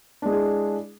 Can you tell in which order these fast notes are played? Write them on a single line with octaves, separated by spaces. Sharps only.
D4 G#3 E4 G#4